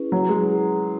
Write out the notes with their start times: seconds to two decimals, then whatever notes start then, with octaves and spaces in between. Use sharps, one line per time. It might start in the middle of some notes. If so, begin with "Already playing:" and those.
Already playing: C#4 E4 G#4 B4
0.12 F#3
0.29 G#3